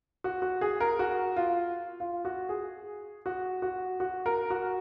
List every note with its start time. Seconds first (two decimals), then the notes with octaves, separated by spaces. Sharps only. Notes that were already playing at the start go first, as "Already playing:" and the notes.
0.24 F#4
0.42 F#4
0.61 G#4
0.80 A#4
0.99 F#4
1.37 F4
2.00 F4
2.25 F#4
2.49 G#4
3.26 F#4
3.62 F#4
4.00 F#4
4.26 A#4
4.50 F#4